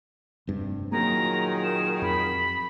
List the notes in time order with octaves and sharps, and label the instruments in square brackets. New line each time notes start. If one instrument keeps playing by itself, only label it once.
[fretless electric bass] F1 G2 C3
[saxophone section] A#2 D#3 G#4 [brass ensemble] F#3 [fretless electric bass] A#3 [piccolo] A#5
[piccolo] E7
[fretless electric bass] F2 [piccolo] B5